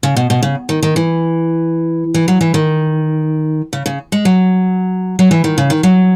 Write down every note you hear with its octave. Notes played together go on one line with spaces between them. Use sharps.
C#3
B2
B2
C#3
D#3
D#3
E3
E3
F#3
E3
D#3
C#3
C#3
G#3
F#3
F#3
E3
D#3
C#3
D#3
F#3